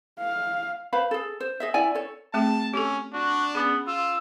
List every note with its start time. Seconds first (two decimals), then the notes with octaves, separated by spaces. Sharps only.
0.20 F5
0.93 B4 C5 F5 B5
1.11 G#4 A4
1.40 C5
1.60 G#4 D#5 E5
1.74 E4 D5 G#5
1.95 A4 C#5
2.34 A3 C4 G#4 A5
2.74 C#4 G4 A4
3.13 D4 F#4
3.55 B3 C#4 G#4
3.87 F4 E6